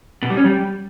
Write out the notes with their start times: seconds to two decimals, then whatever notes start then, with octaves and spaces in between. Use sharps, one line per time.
0.22 B2
0.30 G3
0.37 C#4
0.44 G3